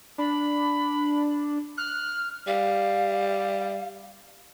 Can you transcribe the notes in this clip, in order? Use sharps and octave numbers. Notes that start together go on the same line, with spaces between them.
D4 B5
F6 F#6
G3 F5